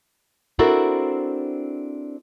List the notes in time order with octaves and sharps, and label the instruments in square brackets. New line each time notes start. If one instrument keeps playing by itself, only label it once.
[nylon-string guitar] C4 D4 E4 F#4 A4 A#4